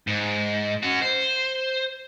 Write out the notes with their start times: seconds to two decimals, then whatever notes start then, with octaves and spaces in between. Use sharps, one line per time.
0.07 G#2
0.83 C#4 F#4
1.03 C5